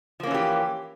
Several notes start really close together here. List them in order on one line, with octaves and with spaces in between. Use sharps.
F3 A#3 C#4 E3 G4